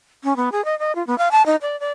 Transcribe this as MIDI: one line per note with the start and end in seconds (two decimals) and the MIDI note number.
0.24 0.36 61
0.36 0.49 59
0.52 0.64 68
0.65 0.78 75
0.79 0.95 75
0.95 1.05 65
1.07 1.17 59
1.18 1.29 77
1.31 1.45 81
1.46 1.56 63
1.62 1.78 74
1.80 1.92 74